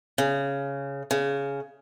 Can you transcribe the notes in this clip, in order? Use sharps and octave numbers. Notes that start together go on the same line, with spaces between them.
C#3
C#3